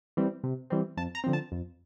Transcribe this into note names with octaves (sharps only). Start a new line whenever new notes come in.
E3 G3 C4
C3
E3 G3 C4
F2 A5
A#5
D3 F3 C4
A5
F2